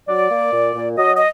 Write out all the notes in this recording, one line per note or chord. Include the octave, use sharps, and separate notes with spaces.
F#3 D5
A#3
A#2
A#2
F#3 D#5
D#5